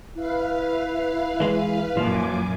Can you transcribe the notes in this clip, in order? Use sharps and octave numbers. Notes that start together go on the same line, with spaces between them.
E4 B4 F5
E3 G#3
F#2 A#2 F3 G#5 D6